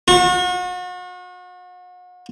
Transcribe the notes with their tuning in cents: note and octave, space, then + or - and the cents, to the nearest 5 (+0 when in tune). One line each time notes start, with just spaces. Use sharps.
F#4 -40